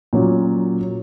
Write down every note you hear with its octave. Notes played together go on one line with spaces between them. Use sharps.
A#2 F#3 C#4